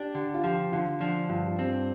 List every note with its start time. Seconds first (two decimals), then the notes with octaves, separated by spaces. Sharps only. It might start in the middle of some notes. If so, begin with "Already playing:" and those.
Already playing: D4 G4
0.15 D3 G4
0.34 F4
0.43 F3 G4
0.72 D3 F4
1.00 F3 D4
1.29 G2 F4
1.48 F4
1.58 C4 G4